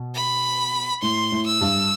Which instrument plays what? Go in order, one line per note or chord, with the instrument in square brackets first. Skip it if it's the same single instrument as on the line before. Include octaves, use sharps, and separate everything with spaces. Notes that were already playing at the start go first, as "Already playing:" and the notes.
Already playing: [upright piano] B2
[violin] B5
[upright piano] A2 [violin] C6
[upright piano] A2
[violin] E6
[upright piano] G2